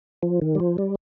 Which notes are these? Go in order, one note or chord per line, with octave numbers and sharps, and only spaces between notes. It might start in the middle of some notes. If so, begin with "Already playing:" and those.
F3
D#3
G3
F3
G3